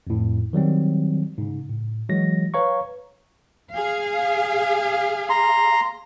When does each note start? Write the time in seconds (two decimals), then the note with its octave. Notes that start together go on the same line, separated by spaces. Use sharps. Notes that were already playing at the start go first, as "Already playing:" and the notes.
0.07 F2 A2
0.53 D#3 F#3 G3 C4
1.38 G#2 C#3
1.69 A2
2.09 E3 F#3 G#3 A#6
2.54 B4 C#5 F5 A#5 C#6
3.70 G#4 F5
5.30 A#5 C6